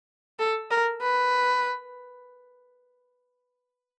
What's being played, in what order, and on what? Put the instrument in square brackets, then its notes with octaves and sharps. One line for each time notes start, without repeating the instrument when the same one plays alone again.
[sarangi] A4
A#4
B4